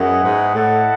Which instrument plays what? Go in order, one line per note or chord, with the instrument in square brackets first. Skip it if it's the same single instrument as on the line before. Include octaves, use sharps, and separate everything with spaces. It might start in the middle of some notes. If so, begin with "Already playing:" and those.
Already playing: [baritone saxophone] F#2 [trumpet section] B3 E4 G#4 D#5 F#5
[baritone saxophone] G#2
[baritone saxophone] A2 [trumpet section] E4 A4 D#5 F#5